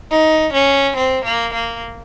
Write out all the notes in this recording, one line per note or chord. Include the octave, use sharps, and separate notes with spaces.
D#4
C#4
C4
A#3
A#3